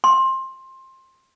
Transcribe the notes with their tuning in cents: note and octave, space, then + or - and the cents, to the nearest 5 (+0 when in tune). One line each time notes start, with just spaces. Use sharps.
C6 +20